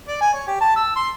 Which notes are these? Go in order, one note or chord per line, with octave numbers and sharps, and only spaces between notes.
D5
G#5
C#5
G4
A5
E6
C6